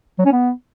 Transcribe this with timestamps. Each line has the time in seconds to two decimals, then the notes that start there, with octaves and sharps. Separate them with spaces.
0.19 F#3
0.25 C#4
0.32 B3